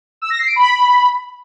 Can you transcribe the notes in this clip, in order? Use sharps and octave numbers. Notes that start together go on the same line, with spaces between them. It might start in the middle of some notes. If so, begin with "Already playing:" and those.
E6
A#6
C7
D7
B5